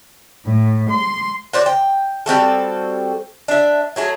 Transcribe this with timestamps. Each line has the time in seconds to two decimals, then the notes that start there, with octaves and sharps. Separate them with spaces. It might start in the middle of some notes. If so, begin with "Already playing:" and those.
0.45 A2
0.89 C6
1.53 F#4 C5 D5
1.66 G5
2.26 G3 C4 F#4 A4
3.48 D4 E5
3.96 F#3 A3 G#4